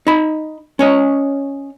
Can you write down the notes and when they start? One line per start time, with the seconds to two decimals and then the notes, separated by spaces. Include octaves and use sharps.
0.07 D#4 B5
0.79 C#4 C#5 D#5